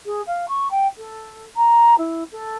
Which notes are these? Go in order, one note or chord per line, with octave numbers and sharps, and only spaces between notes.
G#4
F5
C#6
G5
A4
A#5
E4
A4